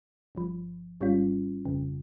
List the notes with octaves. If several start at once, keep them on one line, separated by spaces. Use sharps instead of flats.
G1 G2 F3
G#1 G#2 G3 C#4 F4
G1 F2 C#3